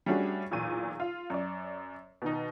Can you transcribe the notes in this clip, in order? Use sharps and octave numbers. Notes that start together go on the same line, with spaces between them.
G3 A3 C#4 D4 F#4 G#4
B1 E2 A#2 D#7
F4
F#2 D5
B2 D#3 D#4